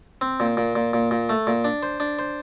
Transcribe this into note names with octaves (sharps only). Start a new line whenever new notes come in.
C4
A#2
A#2
A#2
A#2
A#2
A3
A#2
D4
C5
D4
C5